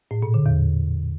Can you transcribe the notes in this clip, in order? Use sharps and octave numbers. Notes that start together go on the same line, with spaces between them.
A2
A#2
D3
E2